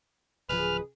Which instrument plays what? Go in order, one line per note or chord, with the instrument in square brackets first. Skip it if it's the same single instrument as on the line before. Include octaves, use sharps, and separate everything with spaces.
[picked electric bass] D1 F3 [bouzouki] C#3 G#3 G#4 [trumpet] B4 [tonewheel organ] F6